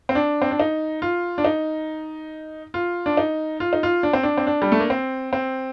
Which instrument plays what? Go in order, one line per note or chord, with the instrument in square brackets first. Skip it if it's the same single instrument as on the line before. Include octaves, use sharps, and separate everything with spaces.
[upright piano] C4
D4
C4
D4
D#4
F4
D4
D#4
F4
D4
D#4
F4
D#4
F4
D4
C4
D4
C4
D4
G3
A3
A#3
C4
C4